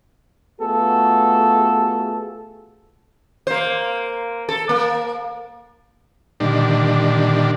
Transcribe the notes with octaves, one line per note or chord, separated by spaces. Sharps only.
A3 B3 F4 F#4 G#4 A4
A#3 C5
A4
A#3
A#2 D3 D#3 G3 D4